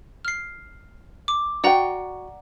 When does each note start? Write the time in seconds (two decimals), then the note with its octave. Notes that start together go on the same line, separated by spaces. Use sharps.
0.25 F6 C7
1.28 D6
1.64 F#4 D5 F#5 G5 A#5